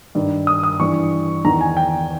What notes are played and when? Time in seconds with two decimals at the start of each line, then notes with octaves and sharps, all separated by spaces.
0.15 G2 D#3
0.47 D#6
0.64 D#6
0.80 G2 E3 C#6
1.45 E2 D#3 A#5
1.61 G#5
1.77 G5